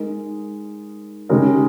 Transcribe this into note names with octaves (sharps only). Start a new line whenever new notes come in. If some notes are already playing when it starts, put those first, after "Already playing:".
Already playing: G#3 D#4 A#4
C#3 G#3 D#4 G4 A#4